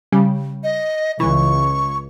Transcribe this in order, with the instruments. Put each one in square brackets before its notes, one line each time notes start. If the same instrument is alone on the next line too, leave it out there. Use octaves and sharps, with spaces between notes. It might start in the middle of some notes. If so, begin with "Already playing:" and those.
[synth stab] C#3 G3
[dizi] D#5
[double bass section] C#2 [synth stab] E3 [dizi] C#6